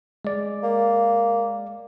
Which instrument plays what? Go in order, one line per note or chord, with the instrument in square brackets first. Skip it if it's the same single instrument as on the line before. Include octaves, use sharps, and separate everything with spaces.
[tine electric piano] G#3 D5
[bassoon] A#3